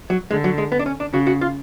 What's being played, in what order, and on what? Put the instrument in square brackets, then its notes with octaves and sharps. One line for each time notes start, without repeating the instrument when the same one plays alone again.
[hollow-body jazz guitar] F#3
[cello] D3 [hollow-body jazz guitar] G#3
[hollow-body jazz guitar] F#3
G#3
B3
D4
C#4
D4
[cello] C#3 [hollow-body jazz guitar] F#4
[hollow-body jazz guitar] F#4
F4